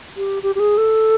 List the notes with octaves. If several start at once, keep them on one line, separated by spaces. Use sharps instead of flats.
G4
G4
G4
G#4
A4